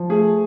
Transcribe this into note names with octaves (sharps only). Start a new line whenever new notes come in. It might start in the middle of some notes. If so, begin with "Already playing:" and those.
Already playing: F3
A3 G#4